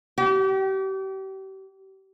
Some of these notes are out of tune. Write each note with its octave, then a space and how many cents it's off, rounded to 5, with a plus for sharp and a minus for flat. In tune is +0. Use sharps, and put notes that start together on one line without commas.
G4 -35